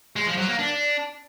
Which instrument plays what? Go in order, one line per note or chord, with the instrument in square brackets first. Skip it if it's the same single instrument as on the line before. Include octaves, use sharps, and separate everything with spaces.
[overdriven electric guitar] G#3
F3
F#3
A#3
D4